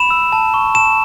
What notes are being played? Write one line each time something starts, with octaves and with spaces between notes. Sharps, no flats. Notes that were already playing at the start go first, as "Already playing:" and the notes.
Already playing: B5 E7
E6
A5
C#6
A5 E7